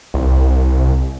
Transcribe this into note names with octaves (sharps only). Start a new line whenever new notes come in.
C2